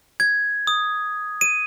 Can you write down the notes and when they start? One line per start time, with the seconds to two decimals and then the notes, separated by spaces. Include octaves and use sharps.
0.20 G#6
0.67 D#6
1.41 D#7